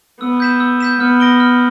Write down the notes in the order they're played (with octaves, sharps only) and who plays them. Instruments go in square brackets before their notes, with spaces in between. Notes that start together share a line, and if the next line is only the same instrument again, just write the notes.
[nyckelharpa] B3 [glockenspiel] E6
[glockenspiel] G6 B6 E7
E6
G6 B6 E7
[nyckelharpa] B3 [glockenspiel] F6
[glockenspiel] A#6 D7 G7
F6